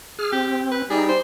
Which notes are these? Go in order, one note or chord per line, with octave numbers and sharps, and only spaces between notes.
G#4 F6
C4 G4
B4
G3 D#4 G#4
C5